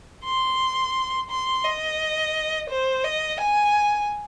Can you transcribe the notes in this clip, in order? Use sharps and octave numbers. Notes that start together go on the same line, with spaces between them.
C6
C6
D#5
C5
D#5
G#5